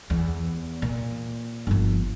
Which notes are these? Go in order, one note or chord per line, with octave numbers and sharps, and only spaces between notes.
E2
A#2
G1 F3